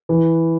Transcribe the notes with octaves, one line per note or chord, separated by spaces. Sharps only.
E3